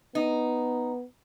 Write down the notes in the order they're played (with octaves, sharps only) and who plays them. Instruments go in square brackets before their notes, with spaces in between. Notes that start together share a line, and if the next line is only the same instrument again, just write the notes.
[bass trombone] B3 [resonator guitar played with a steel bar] D#4